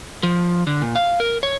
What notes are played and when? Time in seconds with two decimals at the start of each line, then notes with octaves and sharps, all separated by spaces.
0.23 F3
0.67 D3
0.82 A#2
0.95 F5
1.20 A#4
1.43 C#5